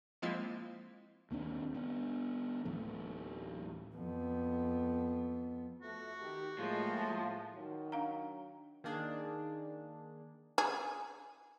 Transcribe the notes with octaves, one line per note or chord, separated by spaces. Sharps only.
F3 G#3 A#3 C4 E4 F4
D#2 A#3 C4 D4
B3 D4
D1 A2 E3 A3
F2 B3
F2 A3 F#4
D#3 G4
A2 F3 G#3 A#3
D#3 F#3
D4 F5 A#5
D#3 A#3 D4 G#4
G#4